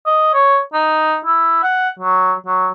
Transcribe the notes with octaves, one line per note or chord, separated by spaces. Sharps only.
D#5
C#5
D#4
E4
F#5
F#3
F#3